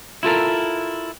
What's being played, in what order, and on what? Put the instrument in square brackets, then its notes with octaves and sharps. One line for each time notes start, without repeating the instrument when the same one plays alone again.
[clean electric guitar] E4 F4 A4 A#4